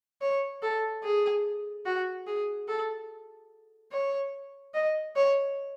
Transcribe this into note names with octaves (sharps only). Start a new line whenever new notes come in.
C#5
A4
G#4
F#4
G#4
A4
C#5
D#5
C#5